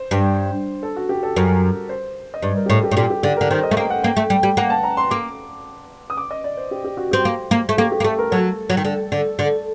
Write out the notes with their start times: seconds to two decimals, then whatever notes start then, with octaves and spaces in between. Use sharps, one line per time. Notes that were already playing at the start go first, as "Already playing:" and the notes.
Already playing: C5
0.11 G2
0.83 A4
0.96 F#4
1.09 G4
1.23 A4
1.36 F#2 A#4
1.89 C5
2.34 D#5
2.43 G2 D5
2.56 A#4
2.66 G4
2.70 A2 A4
2.83 G4
2.91 A2
2.97 A#2 G4
3.10 G4
3.23 D3 G4
3.37 D3 A#4
3.50 D#3 C5
3.63 D#5
3.71 A3
3.77 A#3 G5
3.90 F#5
4.04 A#3 G5
4.17 A3
4.30 G3
4.43 G3
4.57 A#3 F#5
4.70 A5
4.83 A#5
4.97 C6
5.11 A#3 D6
6.10 D#6
6.17 D6
6.31 D#5
6.44 D5
6.57 C5
6.71 G4
6.84 G4
6.97 F#4
7.11 C4 G4
7.25 A#3
7.51 A#3
7.69 A3
7.78 A#3 G4
7.92 G4
8.00 A#3
8.04 A3 A4
8.18 A#4
8.31 F#3 A4
8.70 F#3
8.77 D#3
8.85 D3
9.12 D3
9.39 D3